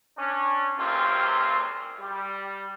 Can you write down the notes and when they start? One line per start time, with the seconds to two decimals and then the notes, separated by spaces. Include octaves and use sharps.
0.17 C#4 D4
0.79 C#2 F#2 A#2 C4 F4 G4
2.00 G3